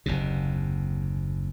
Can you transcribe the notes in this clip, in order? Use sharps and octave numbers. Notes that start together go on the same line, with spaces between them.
F#1 D#2 C3